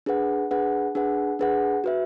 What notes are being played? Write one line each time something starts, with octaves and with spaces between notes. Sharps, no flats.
D4 G#4 B4 F#5
D4 G#4 B4 F#5
D4 G#4 B4 F#5
D4 G#4 B4 F#5
F#4 B4 E5